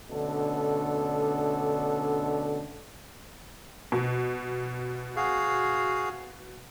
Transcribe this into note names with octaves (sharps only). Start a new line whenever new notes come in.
B2 D3 A3 C#4 D4 A4
B2
F#4 G#4 F5